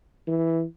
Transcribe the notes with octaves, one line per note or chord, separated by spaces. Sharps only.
E3